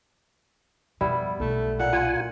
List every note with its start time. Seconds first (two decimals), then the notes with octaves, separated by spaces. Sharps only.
1.01 F2 B2 G3 B3 E4
1.40 B1 A3
1.79 A#2 F#5
1.93 A#3 F4 G#5